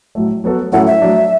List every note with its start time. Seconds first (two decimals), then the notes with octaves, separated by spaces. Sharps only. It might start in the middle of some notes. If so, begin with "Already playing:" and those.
0.15 A2 F#3 A3
0.44 F#3 B3 F#4 A4
0.72 A2 F#3 C#4 E4 A4 F#5
0.87 E5
1.02 F#3 A3 D4